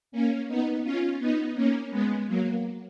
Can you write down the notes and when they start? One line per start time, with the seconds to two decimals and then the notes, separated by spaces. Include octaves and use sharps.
0.12 A#3 C#4
0.48 B3 D#4
0.84 C#4 F4
1.19 B3 D#4
1.55 A#3 C#4
1.90 G#3 B3
2.27 F#3 A#3